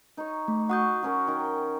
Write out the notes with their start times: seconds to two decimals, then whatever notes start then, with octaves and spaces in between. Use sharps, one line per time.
0.17 D#4 C#5
0.48 A3
0.69 F#4 F#5 D#6 G6
1.03 F#3 C#4 A#4
1.27 D#3 G5